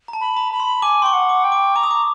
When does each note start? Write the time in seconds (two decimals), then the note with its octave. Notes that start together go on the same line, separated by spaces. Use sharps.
0.08 A#5
0.13 A5
0.21 B5
0.37 A#5
0.52 B5
0.60 C6
0.82 G#5 D6
1.02 G5 C6 C#6
1.13 F#5
1.29 D6
1.44 G5
1.52 D6
1.76 A#5 D6
1.83 D#6
1.91 D6